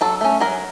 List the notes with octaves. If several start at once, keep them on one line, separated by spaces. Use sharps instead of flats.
F#3 A4
A3 C#4
F#3 A#4